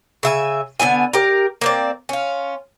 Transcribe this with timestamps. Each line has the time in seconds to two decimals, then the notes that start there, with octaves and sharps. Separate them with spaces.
0.23 C#3 E5 G#5
0.80 D3 B3 E4 G#5
1.13 G4 A#4
1.61 A#3 C4 D5
2.09 C#4 F4